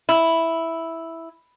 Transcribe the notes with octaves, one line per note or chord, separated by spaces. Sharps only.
E4